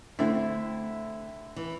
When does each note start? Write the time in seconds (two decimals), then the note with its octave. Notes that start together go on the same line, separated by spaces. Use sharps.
0.19 D3 A3 C4 E4
1.56 E3